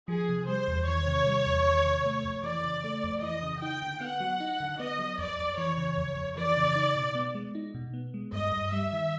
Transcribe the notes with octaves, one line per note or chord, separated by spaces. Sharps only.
F3 G#4
C3
G3 C5
E2
D#3 C#5
C3
G3
E2
D#3
C3
A3
F2
E3 D5
C#3
A3
F2
E3 D#5
C#3
D#4 G5
D3
B3 F#5
F#3
D#4
D3
B3 D#5
F#3
F2 D5
F2
E3 C#5
C#3
F2
F2
E3 D5
C#3
D#4
B2
B3
G#3
D#4
B2
B3
G#3
G2 D#5
G2
G3 E5
D#3